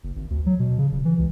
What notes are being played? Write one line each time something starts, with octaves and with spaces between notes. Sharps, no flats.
F#1
G#1
D2
F#3
B2
C#3
D#1
E3
C#2